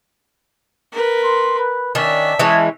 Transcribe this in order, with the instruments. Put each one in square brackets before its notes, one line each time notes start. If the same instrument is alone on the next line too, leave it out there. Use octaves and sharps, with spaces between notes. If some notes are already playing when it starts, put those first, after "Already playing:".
[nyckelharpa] A#4 B4
[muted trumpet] C6
B4
[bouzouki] D#3 D4 [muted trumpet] C#4 [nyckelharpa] E5
[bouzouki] E3 G#3 C#4 [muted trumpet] A5